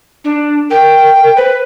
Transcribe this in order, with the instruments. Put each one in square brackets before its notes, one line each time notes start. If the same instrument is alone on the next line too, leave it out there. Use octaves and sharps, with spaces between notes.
[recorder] D4
[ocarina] A#4 [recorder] G5
[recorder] B4 [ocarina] C5